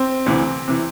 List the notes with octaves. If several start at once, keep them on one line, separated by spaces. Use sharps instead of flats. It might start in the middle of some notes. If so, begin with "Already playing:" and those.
Already playing: C4
D2 C3 E3
C3 E3